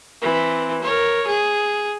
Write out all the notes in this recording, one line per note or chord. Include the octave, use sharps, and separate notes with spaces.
E3 C4
A#4 C#5
G#4